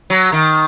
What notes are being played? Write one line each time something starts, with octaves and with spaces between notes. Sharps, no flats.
F#3
D#3